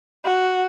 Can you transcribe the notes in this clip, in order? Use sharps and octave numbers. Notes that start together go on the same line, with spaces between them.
F#4